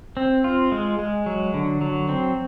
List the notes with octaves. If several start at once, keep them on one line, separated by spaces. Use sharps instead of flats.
C4
F4
G#3
G#3
F#3
D3
F#3
C4